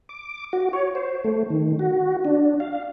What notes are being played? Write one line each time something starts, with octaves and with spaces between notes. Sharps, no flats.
D6
F#4
C#5
C5
A3
D#3
F#4
D4
F5